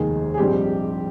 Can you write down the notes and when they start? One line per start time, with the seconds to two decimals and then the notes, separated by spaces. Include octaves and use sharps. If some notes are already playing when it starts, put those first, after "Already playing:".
Already playing: F1 D#2 D#3 G#3 G#4
0.34 G#4
0.38 A#1 G#2 G3 C4 G4